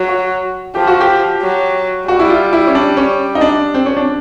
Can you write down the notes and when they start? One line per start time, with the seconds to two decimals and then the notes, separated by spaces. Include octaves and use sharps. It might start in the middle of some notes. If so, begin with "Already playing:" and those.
Already playing: F#3
0.08 F#4
0.75 F3 G4
0.87 F#4
1.01 G4
1.41 F#3
2.08 G3 F#4
2.20 E4
2.30 F4
2.53 E4
2.67 C#4
2.75 D4
2.97 C#4
3.35 D#4
3.41 D4
3.74 C4
3.86 C#4
3.97 D4